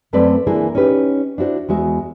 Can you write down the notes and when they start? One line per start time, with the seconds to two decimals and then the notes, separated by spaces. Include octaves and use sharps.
0.13 F#2 A3 C4 B4 D5
0.47 E3 A#3 D4 E4 G#4
0.75 C#4 D#4 G4 B4
1.38 D4 E4 F#4 C5
1.69 E2 G#3 F#4 E5